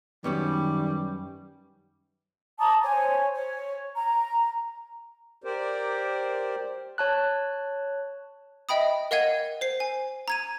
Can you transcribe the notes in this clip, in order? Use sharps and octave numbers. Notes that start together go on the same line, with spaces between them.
F#2 D#3 G3 B3 C#4
A5 A#5 D6 D#6
C5 C#5 G#5
C#5
A#5
G4 A#4 C5 D5
C#5 A5 F#6
D#5 E5 G5 B5 D#6
A#4 D#5 F5 F#5 G#6 D#7
C5 C7
G#5
A#5 G#6 D#7